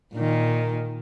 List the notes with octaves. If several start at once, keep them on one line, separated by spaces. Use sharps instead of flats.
A#2 D#3